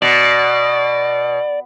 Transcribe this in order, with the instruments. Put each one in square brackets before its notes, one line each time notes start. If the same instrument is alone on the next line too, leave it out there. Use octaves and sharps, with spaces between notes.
[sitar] B2 [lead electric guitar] D5